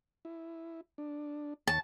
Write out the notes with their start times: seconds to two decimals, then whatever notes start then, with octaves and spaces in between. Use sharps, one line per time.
0.25 E4
0.98 D4
1.67 D#2 C#5 A5